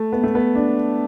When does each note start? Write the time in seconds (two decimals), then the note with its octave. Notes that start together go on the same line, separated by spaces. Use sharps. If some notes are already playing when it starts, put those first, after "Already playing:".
Already playing: A3
0.13 B3
0.24 A3
0.35 B3
0.55 D4